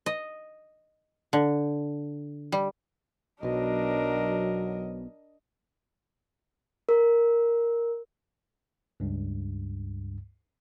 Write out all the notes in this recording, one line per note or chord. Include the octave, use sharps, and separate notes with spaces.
D#5
D3
G3
B1 B2 F#3 D4 A#4 D#5
A#4
C#2 G2